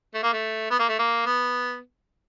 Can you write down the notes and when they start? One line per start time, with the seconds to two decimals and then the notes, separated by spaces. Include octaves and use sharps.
0.14 A3
0.23 A#3
0.33 A3
0.71 B3
0.79 A#3
0.89 A3
0.99 A#3
1.26 B3